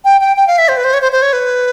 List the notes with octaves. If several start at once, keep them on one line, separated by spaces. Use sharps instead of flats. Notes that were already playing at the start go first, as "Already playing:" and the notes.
G5
G5
G5
F5
E5
C5
B4
C5
C#5
C5
C5
C#5
B4